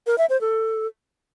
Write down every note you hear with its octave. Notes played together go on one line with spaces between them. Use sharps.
A#4
E5
C5
A4